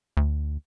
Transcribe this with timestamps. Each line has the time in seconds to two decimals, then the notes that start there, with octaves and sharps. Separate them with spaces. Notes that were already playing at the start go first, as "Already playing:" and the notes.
0.17 D2